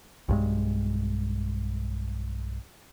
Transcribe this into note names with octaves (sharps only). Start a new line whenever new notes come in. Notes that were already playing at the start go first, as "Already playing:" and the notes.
B1 G2 G#3